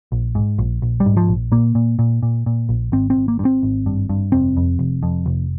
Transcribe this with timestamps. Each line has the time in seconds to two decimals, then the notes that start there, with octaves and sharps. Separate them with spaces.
0.12 A#1
0.35 G#2
0.58 A#1
0.82 A#1
1.00 G3
1.06 G#2
1.17 F3
1.28 A#1
1.52 A#2 A#3
1.75 A#2
1.99 A#2
2.23 A#2
2.46 A#2
2.69 A#1
2.92 G#1 C4
3.10 C4
3.16 G#1
3.28 A#3
3.39 G2
3.45 C4
3.63 G#1
3.86 G2
4.09 G2
4.32 F1 C4
4.57 F2
4.79 F1
5.03 F2
5.26 F1